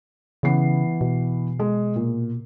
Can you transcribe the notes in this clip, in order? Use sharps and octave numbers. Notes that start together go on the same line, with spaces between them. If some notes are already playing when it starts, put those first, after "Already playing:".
C#3 E3 B3 C7
B2
G#3
A#2